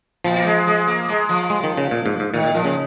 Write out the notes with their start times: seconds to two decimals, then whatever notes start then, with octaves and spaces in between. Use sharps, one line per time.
0.24 A#2 F3
0.37 A#3
0.45 G#3
0.67 G#3
0.87 A#3
1.09 G#3
1.29 F3
1.50 G#3
1.64 D#3
1.78 C#3
1.91 A#2
2.06 G#2
2.20 G#2
2.34 A#2 D#3
2.44 A#2
2.55 A#2 F3
2.65 C#3